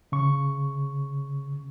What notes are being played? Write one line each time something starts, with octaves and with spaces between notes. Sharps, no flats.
C#3 C#6